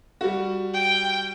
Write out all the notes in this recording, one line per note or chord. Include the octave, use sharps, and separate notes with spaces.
G3 F#4
G5